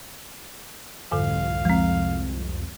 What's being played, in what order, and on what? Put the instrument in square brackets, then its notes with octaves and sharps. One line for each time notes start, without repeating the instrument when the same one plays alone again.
[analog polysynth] C2 F2 [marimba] G#2 D3 A4 [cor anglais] F5
[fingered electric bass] F3 [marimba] G#3 C4